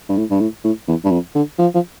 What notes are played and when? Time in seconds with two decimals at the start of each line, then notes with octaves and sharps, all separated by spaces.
0.09 G2
0.17 A2
0.30 G2
0.40 A2
0.64 A2
0.88 E2
1.05 G2
1.11 F2
1.35 D3
1.59 F3
1.75 F3